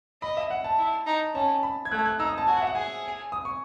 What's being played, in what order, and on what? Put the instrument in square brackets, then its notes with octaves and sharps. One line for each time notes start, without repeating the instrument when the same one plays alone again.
[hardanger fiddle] D#5 [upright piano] B5
[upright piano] E5
F#5
A5
[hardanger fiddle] E4
D#4
[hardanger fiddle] C#4 [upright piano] A5
[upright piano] B5
G#6
[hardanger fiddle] A3 [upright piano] F#6
[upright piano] G#6
F#6
[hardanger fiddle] D#4 [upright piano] E6
[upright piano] D#6
A5
[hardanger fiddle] F#4 [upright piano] G#5
[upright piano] F#5
E5
F#5
[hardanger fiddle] G#4 [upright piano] G#5
[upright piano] D#6
C#6